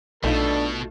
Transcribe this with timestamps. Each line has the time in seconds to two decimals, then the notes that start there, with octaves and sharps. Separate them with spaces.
0.24 A#1 B2 A3 D4 D#4 F4 A4